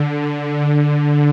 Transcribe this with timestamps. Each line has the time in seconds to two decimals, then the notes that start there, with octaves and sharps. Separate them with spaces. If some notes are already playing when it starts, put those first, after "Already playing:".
Already playing: D3
0.11 D3
0.64 D3